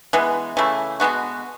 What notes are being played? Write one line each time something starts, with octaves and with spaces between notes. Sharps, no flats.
E3 G#3 B3
C#3 E3 A3 E4
B2 G#3 B3 F#4